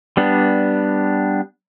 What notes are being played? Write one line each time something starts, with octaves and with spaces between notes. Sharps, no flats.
G3 B3 D4